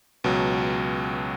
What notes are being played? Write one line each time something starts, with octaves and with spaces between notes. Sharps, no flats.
C#2 B2 F#3